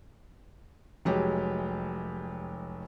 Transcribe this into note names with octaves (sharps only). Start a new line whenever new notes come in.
F1 F#3 G#3 G4